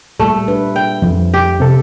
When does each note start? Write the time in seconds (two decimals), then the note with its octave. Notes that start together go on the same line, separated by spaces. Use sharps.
0.19 A#2 G3 A3 A4
0.48 D4 B4
0.76 G5
1.02 F2 F3
1.34 G4
1.60 C3 A4